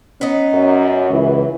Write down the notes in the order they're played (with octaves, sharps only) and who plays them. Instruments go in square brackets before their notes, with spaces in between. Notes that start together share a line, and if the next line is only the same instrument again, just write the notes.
[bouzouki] B3 D#4 [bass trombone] C#4
[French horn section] F#2
[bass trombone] C#2 [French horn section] E3